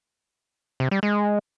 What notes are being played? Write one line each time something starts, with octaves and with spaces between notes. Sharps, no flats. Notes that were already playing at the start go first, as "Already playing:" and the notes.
C3
G3
G#3